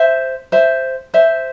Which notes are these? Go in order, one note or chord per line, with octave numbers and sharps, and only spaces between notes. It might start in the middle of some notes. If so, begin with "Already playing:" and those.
Already playing: C5 E5
C5 E5
C5 E5